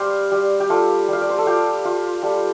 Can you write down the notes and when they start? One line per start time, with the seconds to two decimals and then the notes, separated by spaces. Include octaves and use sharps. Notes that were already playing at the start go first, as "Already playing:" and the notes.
Already playing: G3 C5 D5 F5 G5
0.32 G3
0.60 G4
0.70 F4 A4
1.08 G3 F5
1.21 D5
1.29 C5
1.38 A4
1.47 F4 G4
1.85 F4
2.23 G3 A4